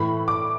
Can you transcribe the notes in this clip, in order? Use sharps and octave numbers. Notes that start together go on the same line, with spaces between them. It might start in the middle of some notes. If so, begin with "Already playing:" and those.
Already playing: A2 E3 A3 B5
D6